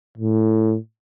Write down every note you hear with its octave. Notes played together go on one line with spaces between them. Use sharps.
A2